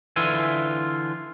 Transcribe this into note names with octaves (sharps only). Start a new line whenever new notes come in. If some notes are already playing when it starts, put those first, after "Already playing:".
D3 E3 F4 E5 G#5